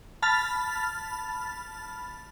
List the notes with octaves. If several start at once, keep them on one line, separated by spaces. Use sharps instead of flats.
A5 B5 F6 A6